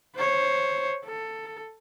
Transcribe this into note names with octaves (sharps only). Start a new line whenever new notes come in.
C5 C#5
A4